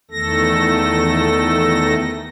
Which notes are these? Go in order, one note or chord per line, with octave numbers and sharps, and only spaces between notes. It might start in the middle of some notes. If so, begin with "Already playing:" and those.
E2 D#3 A3 A4 A#6